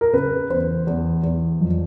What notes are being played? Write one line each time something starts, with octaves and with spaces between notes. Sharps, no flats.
A#4
C#3 B4
E2 C5
E2
E2
F2